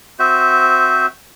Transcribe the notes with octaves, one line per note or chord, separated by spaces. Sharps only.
C4 F#4 C5 E5